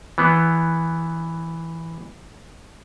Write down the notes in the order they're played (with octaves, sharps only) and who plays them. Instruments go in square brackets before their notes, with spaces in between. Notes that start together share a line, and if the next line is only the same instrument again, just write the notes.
[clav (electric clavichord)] E3 B3